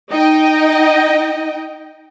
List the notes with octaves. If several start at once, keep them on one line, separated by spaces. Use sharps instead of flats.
D#4 D#5 G5